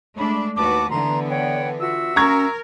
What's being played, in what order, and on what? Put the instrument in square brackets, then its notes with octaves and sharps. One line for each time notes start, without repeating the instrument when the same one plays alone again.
[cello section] G#3 A3 D4 [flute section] B5
[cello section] D#2 F#4 B4 [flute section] A5 D6
[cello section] D3 E3 B3 [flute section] A#5 C6
[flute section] C#5 F#5 G5 [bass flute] D5
[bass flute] F4 [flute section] F#4 E5 E6
[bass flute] C#4 [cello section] A#4 [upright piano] A#5 C#6 G#6